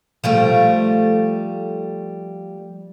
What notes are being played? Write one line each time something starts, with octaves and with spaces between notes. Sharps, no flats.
F3 G3 A3